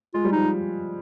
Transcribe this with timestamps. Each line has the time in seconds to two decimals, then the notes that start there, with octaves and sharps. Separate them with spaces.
0.14 G#3 F4
0.25 G3
0.32 F3 D#4